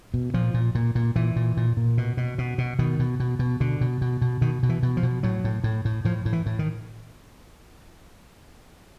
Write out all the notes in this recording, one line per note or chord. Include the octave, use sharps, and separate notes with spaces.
B2
A#2 F3
A#2
A#2
A#2
A#2 E3
A#2
A#2
A#2
B2
B2
B2
B2
B2 D#3
B2
B2
B2
B2 D3
B2
B2
B2
B2 D#3
B2
E3
B2
F3
B2
A2 F#3
A2
A2
A2
A2 F3
A2
E3
A2
D#3